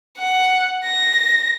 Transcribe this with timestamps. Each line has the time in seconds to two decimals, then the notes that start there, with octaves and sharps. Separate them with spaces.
0.18 F#5
0.84 A#6